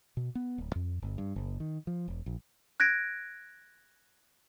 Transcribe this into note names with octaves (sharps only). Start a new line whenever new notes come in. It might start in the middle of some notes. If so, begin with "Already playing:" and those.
B2
B3
D1
F2
G1
G2
F#1
D#3
F3
E1
A#1
F#6 G#6 A#6 D7